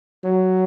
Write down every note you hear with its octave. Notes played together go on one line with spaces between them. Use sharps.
F#3